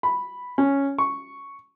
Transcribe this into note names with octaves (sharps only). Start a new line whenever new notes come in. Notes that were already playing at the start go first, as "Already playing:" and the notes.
B5
C#4
C#6